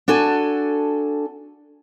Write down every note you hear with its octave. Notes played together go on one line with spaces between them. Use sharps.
D4 F#4 A4 G#5